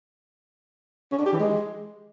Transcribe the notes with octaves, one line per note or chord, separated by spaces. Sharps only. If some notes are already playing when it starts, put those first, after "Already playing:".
C#4
D4
G4
E3
G#3